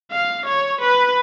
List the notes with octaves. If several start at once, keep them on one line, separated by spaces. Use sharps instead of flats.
F5
C#5
B4